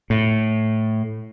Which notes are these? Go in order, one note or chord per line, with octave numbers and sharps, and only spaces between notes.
A2